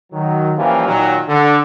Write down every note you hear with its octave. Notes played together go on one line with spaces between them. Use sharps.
D#3 F#3
E3 F3 G3 A#3 C#4 F4
A#2 D#3 F#3
D3